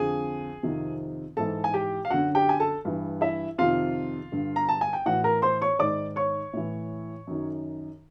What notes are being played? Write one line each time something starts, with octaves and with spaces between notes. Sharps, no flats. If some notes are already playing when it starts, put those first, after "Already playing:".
Already playing: F2 D3 G#4 G#5
F2 C3 D#3
G#2 E3 A4 A5
G#5
G4 G5
F5
F#2 D3 F#4 F#5
G4 G5
G#5
A4 A5
G2 E3
E4 E5
F2 C3 D#3 F4 F5
G2 D3
A#5
A5
G#5
G5
A2 E3 F#4 F#5
A#4 A#5
C5 C6
C#5 C#6
G#2 D#3 D5 D6
C#5 C#6
A2 E3
F#2 D#3